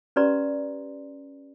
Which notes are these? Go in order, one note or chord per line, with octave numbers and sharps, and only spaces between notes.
C#4 G4 B4 D5 A#5 C6